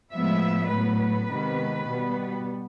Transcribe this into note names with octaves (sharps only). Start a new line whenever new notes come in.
A2 F3 G#3 B3 E5
A2 F#3 B3 B4
B4
C3 D#3 G#3 B3
B2 G3 B3